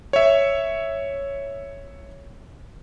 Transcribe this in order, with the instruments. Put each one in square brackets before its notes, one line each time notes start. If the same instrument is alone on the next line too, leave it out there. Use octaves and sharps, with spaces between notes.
[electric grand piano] C#5 E5